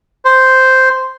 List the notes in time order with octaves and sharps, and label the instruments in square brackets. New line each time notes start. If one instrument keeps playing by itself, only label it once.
[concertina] C5